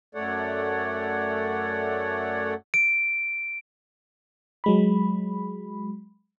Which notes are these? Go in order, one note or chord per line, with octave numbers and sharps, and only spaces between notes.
F#2 A3 A4 C#5 D5 F#5
D7
F#3 G#3 B5